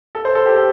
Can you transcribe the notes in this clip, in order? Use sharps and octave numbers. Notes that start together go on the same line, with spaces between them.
A4
C5
A4
G4
A4